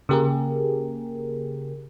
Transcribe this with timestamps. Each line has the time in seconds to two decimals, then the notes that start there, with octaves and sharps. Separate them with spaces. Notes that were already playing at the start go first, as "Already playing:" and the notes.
0.09 C#3 A#3 G4 G#4 A#4